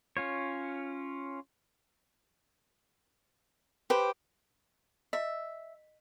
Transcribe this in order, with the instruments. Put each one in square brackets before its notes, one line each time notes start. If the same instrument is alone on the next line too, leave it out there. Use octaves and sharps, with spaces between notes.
[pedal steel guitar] C#4 F4 C#5
[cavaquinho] G4 C5 [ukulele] B4
[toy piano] D#5 [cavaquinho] E5